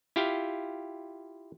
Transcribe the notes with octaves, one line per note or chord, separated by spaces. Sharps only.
E4 F4 G4 F5 G5